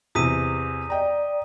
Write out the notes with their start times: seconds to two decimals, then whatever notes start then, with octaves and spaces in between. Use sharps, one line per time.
0.15 E2 C3 D#6 B6 D#7
0.90 D5 D#5 G5 A#5